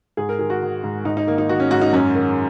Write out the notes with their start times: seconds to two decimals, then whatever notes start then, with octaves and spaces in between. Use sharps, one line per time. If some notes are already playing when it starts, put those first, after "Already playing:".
0.17 G#2 G#4
0.29 A#4
0.39 D#3 G#4
0.50 F#4
0.62 D#3
0.84 G#2
1.05 G#2 D#4
1.17 D#4
1.27 D#3 A#3
1.38 D#4
1.49 D#3 F#4
1.60 C#4
1.71 G#2 F#4
1.82 D#4
1.93 F#2 C#4
2.15 D#3